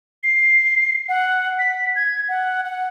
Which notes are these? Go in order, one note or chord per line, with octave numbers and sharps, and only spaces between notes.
C7
F#5
B6
G#6
F#5
F#5